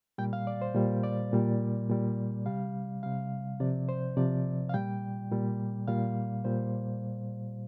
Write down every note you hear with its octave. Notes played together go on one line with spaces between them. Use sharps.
A#2 G3 G5
F5
D5
C5
A#2 G3
D5
A#2 G3
A#2 G3
C3 G3 F5
C3 G3 F5
C3 F3 D5
C5
C3 F3 D5
F5
A#2 G3 G5
A#2 G3
A#2 G3 F5
A#2 G3 C5